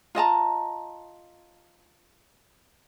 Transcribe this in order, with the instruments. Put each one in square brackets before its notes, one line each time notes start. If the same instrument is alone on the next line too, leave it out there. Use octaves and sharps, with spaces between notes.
[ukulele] F4 D#5 A5 A#5